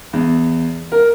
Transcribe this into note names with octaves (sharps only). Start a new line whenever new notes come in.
E2
A#4